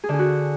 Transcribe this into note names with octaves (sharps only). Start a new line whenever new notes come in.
G#4
D3
G#4
F#4